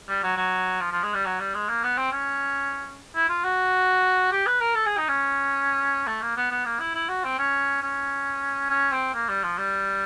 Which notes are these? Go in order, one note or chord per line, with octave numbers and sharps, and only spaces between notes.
G3
F#3
F#3
F3
F3
G#3
G3
F#3
G3
G#3
A#3
B3
C4
C#4
E4
F4
F#4
G4
B4
A#4
A4
G#4
D#4
C#4
A3
A#3
B3
B3
A#3
E4
E4
F#4
C4
C#4
C#4
C#4
C4
A#3
G3
F3
G3